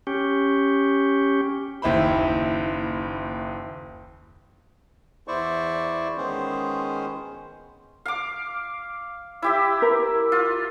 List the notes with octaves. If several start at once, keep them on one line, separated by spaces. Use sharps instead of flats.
C#4 G4
F#1 D#2 E4 C5 B5
E2 E4 C5 D5 C#6
D#3 G#3 B3 C#4 G#4 C5
F5 D6
E4 G4 E5
A#4
F4